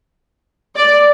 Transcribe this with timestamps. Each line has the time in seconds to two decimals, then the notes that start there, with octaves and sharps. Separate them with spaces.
0.75 D5